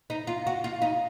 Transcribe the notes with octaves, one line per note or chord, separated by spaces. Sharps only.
D#4
F4
F#4
F4
D#4